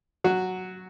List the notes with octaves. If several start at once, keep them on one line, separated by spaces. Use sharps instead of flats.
F#3 F#4